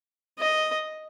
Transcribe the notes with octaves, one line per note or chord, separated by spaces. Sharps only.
D#5